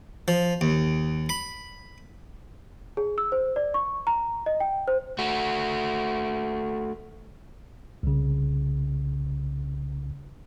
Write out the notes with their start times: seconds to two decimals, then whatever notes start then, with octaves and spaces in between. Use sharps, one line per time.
0.28 F3
0.61 D#2
1.29 B5
2.97 G#4
3.18 E6
3.32 C5
3.56 D5
3.74 C#6
4.07 A#5
4.46 D#5
4.60 G5
4.88 C5
5.19 A3 F#4
8.03 C2 C#3